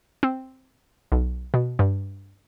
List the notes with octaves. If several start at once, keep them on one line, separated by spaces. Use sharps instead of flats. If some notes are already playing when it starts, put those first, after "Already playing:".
C4
B1
B2
G2